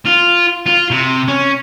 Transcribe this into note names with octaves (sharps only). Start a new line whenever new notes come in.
F4
F4
C3
C#4